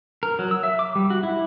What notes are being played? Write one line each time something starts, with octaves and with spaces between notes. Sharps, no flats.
A#4
F#3
E6
E5
D6
G3
F#4
E4